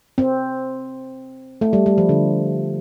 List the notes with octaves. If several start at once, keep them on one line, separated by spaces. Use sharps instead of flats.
C4
A3
G3
G3
F3
D3